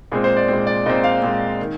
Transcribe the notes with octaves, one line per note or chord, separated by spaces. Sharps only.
A#2 G#3 C4 G#4
C5
D5
A#2 G#3 C4
D5
A#2 G#3 C4 D#5
F5
A#2 G#3 C4
D#3